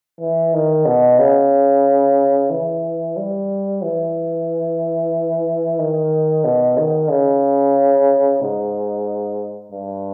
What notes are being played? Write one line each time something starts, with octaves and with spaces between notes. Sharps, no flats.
E3
D#3
B2
C#3
E3
G3
E3
D#3
B2
D#3
C#3
G#2
G2